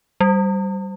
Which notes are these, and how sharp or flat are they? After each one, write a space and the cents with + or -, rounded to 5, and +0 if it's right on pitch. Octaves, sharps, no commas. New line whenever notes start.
G3 -15